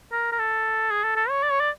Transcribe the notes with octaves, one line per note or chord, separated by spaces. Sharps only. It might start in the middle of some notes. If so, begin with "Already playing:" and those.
A#4
A#4
A4
G#4
A4
A4
C#5
D5
C#5
D5